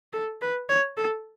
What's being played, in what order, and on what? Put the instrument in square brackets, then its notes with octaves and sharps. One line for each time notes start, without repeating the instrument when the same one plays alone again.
[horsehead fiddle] A4
B4
C#5
A4